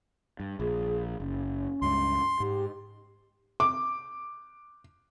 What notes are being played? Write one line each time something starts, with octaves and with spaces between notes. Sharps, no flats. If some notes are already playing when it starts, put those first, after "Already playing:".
G2
A#1 G#4
F#1 C#4
C#2 G2 G#3 C6
G#2 G4
D6